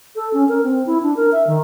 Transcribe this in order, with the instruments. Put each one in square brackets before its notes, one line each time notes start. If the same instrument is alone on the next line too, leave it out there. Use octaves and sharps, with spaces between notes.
[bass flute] A4
C#4
A#4
C4
E4
D4
A#4
E5
D#3